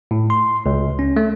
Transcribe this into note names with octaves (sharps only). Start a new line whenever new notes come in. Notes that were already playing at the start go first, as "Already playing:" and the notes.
A2
C6
C#2
C#4
A3